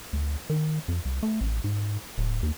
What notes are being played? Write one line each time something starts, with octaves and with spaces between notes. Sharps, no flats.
D2
D#3
F2
C2
A3
A1
G#2
D1
D#2